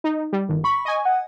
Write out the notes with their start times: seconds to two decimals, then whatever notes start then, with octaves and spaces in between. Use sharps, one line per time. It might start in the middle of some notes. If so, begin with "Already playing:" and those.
0.04 D#4
0.33 G3
0.49 G1 D#3
0.64 B5 C#6
0.85 D#5 G#5
1.05 F#5